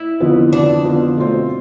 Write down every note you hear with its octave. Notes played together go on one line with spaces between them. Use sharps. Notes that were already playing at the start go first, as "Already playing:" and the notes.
Already playing: E4
F2 D3 F3 B3 F4
F2 D3 F3 B3 D4 F4
F2 D3 F3 B3 F4
B2 A3 C4 F4 C5